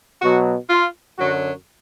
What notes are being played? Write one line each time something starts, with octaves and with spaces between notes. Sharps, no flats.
B2 F#3 F#4
F4
F#2 D3 F#3 F#4